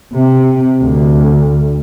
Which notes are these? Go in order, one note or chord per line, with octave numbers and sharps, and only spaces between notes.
C3
D2